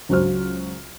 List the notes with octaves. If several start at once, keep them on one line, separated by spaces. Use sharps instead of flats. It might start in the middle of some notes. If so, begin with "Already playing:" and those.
C#2 F#3 F#4 C5 F6